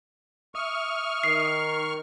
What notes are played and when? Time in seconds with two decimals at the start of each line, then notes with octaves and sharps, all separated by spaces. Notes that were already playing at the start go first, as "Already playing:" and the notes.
0.55 E5 C#6 D#6 F6
1.24 D#3 C7